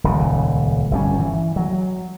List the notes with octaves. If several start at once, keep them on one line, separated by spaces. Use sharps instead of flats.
D#1 C#2 C#3
G1 G3 C#4
E3
F#3